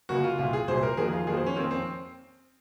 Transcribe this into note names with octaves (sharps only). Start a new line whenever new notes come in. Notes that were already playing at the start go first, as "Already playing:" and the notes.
C#2 C#3 F#3 A#3 F#4
F4
C2 A#2 F#3 F4
G#4
C2 A#2 F#3 C5
A#4
F2 D#3 F#3 A#3 G#4
F4
F2 D#3 F#3 A#3 G#4
C5
C#4
F2 D#3 A#3 C4
C4